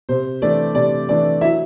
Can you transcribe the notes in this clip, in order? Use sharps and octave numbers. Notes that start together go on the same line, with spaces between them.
C3 C5
E3 A3 D4 D5
C3 D5
E3 A3 D4 D5
F#3 E4 E5